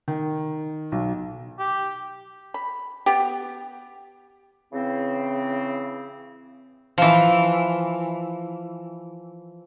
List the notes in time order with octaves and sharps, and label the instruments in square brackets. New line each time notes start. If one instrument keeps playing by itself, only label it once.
[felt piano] D#3
B1
[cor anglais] G4
[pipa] B5
B3 G4
[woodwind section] C#3 E3 C4
[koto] E3 F3